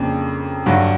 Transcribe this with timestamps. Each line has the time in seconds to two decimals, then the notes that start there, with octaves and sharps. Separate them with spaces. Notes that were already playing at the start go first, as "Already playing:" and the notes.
Already playing: F2 C#3 F3 A#3 D4
0.66 G2 D3 F#3